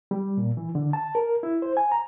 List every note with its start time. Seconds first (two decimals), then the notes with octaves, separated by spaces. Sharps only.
0.11 G3
0.37 A#2
0.57 E3
0.75 D3
0.93 A5
1.15 A#4
1.43 E4
1.62 C5
1.77 G#5
1.92 A#5